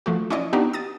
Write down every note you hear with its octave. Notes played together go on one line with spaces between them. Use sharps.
F3 A3 F#4
C#4 E4 D5 D#5
B3 D4 D#4 F#4 G4
D#6 A6 D#7